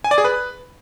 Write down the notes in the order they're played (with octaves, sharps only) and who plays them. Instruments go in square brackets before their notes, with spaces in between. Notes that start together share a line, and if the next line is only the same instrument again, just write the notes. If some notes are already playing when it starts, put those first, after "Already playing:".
[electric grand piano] G#5
D5
G#4
B4